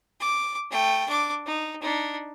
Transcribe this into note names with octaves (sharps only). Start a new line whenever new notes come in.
D6
A3 G5
D4 D6
D#4
D4 D#4